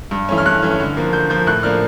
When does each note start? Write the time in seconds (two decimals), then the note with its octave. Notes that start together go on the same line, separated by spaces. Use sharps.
0.11 G2
0.29 E3 A3 C#4
0.38 F6
0.46 G2 F#6
0.62 E3 A3 C#4
0.80 D3
0.97 F3 A#3
1.13 D3 G6
1.30 F3 A#3 G6
1.47 A2 F#6
1.63 F3 A#3 D4 F6